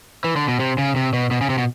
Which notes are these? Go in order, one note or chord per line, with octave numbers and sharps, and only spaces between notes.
E3
D3
B2
C3
C#3
C3
B2
B2
C#3
C3
B2